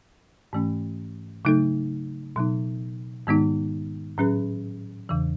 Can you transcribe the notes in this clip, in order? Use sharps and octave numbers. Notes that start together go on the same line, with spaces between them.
G#2 E3 A3 C#4
C#3 F#3 A3 D#4 A4
B2 F#3 B3 D#4
G#2 D#3 G#3 B3 D#4
A2 F#3 C#4 G#4 B4
E2 C#3 E3